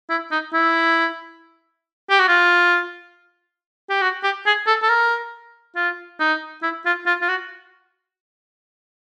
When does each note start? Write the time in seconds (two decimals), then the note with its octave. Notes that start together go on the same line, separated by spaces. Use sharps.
0.10 E4
0.32 D#4
0.53 E4
2.10 G4
2.20 F#4
2.28 F4
3.90 G4
4.02 F#4
4.24 G4
4.46 G#4
4.67 A4
4.82 A4
4.89 A#4
5.76 F4
6.20 D#4
6.63 E4
6.86 F4
7.06 F4
7.22 F4
7.29 F#4